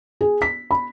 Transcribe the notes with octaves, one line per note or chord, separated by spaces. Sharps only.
G#4
B6
B5